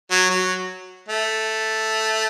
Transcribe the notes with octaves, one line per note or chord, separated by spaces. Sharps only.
F#3
F#3
A3